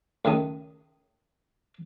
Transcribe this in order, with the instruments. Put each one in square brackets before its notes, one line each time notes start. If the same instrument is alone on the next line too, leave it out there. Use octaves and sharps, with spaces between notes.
[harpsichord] C#2 D#3 A3 D#6